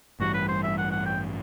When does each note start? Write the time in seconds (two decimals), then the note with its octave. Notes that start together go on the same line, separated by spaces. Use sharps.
0.20 A1 G2 E3 G3 F#4
0.34 B4
0.48 C5
0.63 E5
0.78 F#5
0.91 F#5
1.06 G5